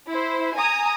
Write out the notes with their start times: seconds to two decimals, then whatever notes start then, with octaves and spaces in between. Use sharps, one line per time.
0.10 E4 C5
0.56 G#5 A#5 D#6